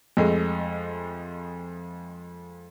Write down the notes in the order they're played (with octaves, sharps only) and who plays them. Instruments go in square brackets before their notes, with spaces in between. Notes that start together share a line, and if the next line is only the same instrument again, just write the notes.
[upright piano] F2 G#3 A3